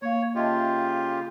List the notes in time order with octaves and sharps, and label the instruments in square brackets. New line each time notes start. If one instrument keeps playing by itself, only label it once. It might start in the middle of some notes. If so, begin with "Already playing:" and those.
[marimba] A#3 F5 [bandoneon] C#5
[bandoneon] C#3 F4 G4 [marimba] D#5 E5 A5